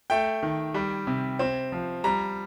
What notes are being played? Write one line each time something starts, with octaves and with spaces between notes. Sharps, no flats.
A3 G5
D#3
G3
C3
C4
F3
G3 A#5